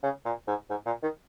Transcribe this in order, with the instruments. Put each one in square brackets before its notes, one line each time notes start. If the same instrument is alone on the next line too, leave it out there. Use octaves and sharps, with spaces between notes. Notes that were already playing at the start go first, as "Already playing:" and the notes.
[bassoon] C#3
A#2
G#2
G#2
A#2
D#3